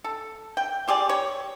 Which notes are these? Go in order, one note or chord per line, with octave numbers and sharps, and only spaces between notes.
A4
G5
C4 G4 G#4 D5
C#5